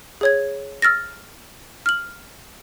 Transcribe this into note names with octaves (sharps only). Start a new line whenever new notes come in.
G#4 C#5 G#6
E6 F6 A6 A#6
F6 F#7